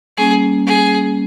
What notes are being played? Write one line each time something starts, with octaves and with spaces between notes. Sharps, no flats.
G3 A#3 C#4 G#4
G#4